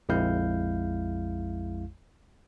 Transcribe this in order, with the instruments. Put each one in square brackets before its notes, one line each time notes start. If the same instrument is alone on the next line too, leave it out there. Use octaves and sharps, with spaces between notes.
[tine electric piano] A#1 F2 G#3 E4 F5 G6